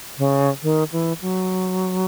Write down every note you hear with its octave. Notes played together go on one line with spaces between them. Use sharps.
C#3
D#3
E3
F#3